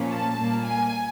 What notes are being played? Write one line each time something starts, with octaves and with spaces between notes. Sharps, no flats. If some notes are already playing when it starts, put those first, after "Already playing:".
Already playing: A#2 F3 A#3 C#4
A5
A#2 G3 A#3
G#5